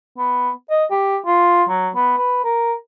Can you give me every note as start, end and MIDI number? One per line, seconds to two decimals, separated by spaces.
0.18 0.50 59
0.70 0.85 75
0.91 1.17 67
1.26 1.64 65
1.69 1.89 54
1.95 2.15 59
2.17 2.43 71
2.44 2.73 70